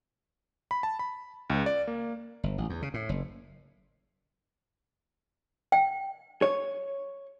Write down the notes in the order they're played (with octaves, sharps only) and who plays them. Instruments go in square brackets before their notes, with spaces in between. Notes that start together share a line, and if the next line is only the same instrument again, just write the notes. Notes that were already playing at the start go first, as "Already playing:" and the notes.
[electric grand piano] B5
A5
B5
C#2
D5
A#3
[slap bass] G1
A1
E2
C#3
A2
F#1
[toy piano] G5
[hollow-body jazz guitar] C#5